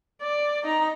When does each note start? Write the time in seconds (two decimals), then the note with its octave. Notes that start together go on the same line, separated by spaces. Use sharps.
0.22 D5
0.63 D#4 A#5